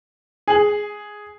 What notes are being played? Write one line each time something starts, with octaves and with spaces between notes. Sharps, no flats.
G#4 F#7